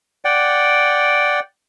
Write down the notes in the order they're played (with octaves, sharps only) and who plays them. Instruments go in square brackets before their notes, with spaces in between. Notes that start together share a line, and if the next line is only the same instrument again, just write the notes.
[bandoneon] D5 F#5 G5